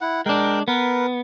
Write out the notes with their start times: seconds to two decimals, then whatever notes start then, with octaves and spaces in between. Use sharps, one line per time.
0.01 E4 F#5
0.26 G#3 D4 A#4 G5
0.68 B3 A#4 B4